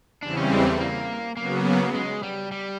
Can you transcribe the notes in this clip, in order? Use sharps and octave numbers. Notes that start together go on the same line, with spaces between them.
E2 C#3 E3 G3 C4 D4
C#4
G#3
A3
A#3
C#3 F#3 A#3 B3
G#3
G3
G3